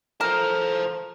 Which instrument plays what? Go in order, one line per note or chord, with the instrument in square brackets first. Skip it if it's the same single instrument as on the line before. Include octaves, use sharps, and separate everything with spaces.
[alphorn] A4 [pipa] A#4 [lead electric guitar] C5 A5